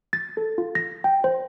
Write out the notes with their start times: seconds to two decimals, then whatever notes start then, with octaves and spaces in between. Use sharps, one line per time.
0.13 A6
0.37 A4
0.58 F4
0.75 A#6
1.04 G5
1.24 C5